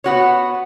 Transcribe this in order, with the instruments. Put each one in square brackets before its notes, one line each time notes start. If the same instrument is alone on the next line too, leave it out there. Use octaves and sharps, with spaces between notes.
[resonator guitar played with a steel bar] B3 F#4 C#5